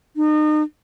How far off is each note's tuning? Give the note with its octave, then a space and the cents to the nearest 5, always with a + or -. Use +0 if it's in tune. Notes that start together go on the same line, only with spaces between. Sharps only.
D#4 -35